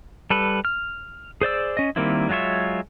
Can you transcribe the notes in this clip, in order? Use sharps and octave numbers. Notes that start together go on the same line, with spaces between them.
G3 A4 B4
F6
G#4 C5 D5 E6
C#4 D#5
D#3 G3 A#3 C4 E4
F#3 G#3 F4 C#5 E5